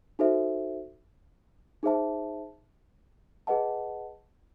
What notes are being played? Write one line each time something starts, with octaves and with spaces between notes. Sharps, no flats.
D#4 F#4 A4 C5 E5
D#4 G#4 C5 E5 A5
G#4 B4 D#5 F#5 A5